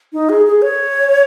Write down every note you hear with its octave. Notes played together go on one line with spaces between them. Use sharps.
D#4
G#4
G#4
C#5